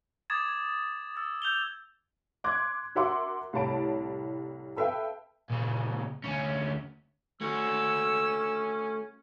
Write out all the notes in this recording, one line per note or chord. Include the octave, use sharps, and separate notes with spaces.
D6 D#6 G#6 A6 E7
G#6
E6 A6
E6 G6 F7 G7
C6 D6 F#6 G#6
F#4 A#4 E5 F#5 C6 D6
C2 A2 C#5 A5 B5 D7
A4 B4 E5 F5 G5
A#2 C#3
D2 C#4
A3 C#4 F#4 E6